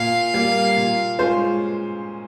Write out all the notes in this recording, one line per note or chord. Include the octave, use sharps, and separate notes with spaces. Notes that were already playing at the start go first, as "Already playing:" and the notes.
Already playing: A#2 F5
G3 A#3
A#2
G#3 C#4 F4 C5